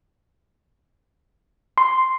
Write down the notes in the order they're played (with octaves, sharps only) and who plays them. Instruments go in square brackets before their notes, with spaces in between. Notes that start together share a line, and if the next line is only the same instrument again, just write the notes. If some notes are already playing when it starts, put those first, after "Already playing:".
[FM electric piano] C6